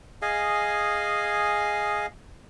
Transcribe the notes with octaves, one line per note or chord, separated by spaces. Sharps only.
G#4 D#5 F5 G#5